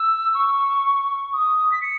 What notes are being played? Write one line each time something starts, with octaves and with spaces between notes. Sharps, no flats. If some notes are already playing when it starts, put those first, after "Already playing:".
Already playing: E6
C#6
D#6
B6
C#7